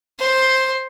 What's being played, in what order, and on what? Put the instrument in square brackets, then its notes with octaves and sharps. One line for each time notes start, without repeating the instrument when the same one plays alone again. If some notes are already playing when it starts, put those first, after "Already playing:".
[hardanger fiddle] C5